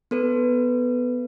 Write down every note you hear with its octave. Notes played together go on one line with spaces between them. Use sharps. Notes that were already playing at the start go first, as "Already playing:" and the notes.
B3 A4 B4